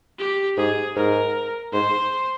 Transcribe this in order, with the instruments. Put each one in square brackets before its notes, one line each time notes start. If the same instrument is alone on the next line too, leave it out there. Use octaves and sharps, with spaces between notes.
[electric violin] G4
[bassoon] G#2 [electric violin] G#4
[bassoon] G#2 [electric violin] A#4
[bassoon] G#2 [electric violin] C5